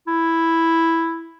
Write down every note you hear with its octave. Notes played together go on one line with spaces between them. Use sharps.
E4